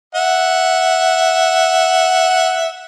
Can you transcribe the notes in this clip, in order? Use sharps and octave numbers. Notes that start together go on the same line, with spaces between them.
E5 F#5